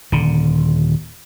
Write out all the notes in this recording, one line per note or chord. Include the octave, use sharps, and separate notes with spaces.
D#1 D3